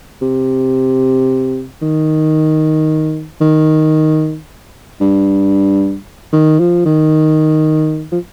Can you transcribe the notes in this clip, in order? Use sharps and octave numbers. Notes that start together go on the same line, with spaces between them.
C3
D#3
D#3
G2
D#3
F3
D#3
F3